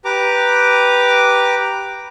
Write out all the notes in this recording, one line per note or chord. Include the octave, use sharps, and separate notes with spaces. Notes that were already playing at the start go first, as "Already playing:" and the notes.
G4 B4 A#5 D6